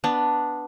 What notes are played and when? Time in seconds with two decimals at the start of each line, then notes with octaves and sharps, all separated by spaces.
0.04 B3 D4